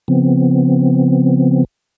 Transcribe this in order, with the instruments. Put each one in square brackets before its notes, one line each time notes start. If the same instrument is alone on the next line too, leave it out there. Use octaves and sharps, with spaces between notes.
[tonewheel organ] C#3 F3 B3 C4